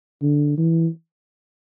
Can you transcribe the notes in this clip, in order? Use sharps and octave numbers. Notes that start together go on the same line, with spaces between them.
D3
E3